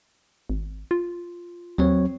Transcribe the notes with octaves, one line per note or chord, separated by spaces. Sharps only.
G#1
F4
D#2 F#3 C4 C#5